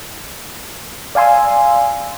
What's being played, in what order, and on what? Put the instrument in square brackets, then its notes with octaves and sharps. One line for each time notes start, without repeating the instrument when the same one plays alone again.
[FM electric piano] D5 F5 G#5 C6 E6